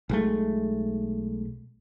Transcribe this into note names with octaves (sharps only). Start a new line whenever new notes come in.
B1 G#3 A3